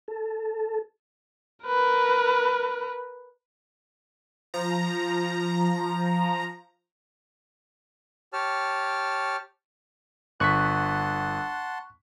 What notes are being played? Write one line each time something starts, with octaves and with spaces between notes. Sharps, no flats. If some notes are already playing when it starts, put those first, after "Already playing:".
A4
A#4 B4
F3 A#5
G4 C#5 A5 F6
G1 F#5 A5 C6 C#6 F#6 B6